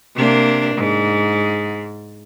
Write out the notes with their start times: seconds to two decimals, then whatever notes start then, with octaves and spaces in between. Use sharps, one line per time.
0.16 C3 A#3 D4
0.76 G#2